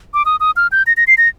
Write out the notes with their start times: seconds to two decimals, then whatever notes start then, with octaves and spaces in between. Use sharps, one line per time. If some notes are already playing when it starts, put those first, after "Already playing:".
0.14 D6
0.25 D#6
0.40 D#6
0.57 F6
0.72 G6
0.87 A#6
0.97 A#6
1.07 C7
1.18 A#6